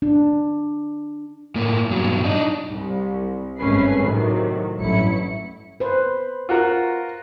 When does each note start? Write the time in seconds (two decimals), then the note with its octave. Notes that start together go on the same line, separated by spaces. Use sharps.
0.02 D4
1.55 A2 A#3
1.90 G2 B2 F#3
2.25 D4 D#4
2.71 C2
3.59 G#1 G2 A3 C#4 B4 C7
4.02 A2 C3 D#3 F#3
4.78 A1 G2 F#3 E4 C#7
5.80 B4 C5
6.49 F4 F#4 A#4